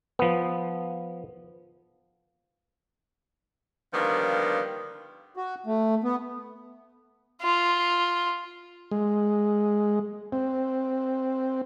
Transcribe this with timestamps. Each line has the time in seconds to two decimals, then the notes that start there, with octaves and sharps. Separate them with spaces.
0.19 F3 B3
3.93 D3 D#3 F3 G3 A#3 B3
5.37 F#4
5.66 A3
6.04 B3
7.42 F4
8.91 G#3
10.32 C4